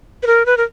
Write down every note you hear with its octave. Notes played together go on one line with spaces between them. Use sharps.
B4
A#4
B4
A#4